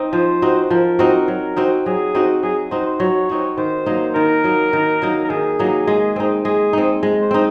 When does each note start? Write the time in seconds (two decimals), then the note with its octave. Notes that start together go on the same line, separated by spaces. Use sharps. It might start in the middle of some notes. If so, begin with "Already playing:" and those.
Already playing: C4 D#4
0.13 F3 C5
0.42 C4 D#4 F#4
0.62 C5
0.71 F3 A#4
0.99 C4 D#4 F#4
1.28 F#3
1.56 C4 D#4 F#4
1.86 F#3 G#4
2.15 C4 D#4 F#4
2.43 F#3 G#4
2.71 C4 D#4 F#4 C5
2.87 C5
3.00 F#3 C#5
3.29 C4 D#4 F#4
3.57 D#3 C5
3.86 F#3 A#3 D#4
4.15 D#3 A#4
4.44 F#3 A#3 D#4
4.73 D#3
5.02 F#3 A#3 D#4
5.24 A#4
5.30 D#3 G#4
5.59 F#3 A#3 D#4
5.87 G#3
6.16 C4 D#4
6.45 G#3 G#4
6.73 C4 D#4
7.03 G#3
7.21 C5
7.31 C4 D#4